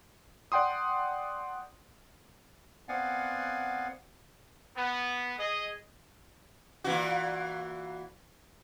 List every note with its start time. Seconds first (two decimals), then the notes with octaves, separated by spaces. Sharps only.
0.52 D5 F#5 G5 C6 D#6
2.89 B3 C4 D5 F5 F#5 G#5
4.76 B3
5.37 G#4 D#5
6.84 A#2 E3 F#4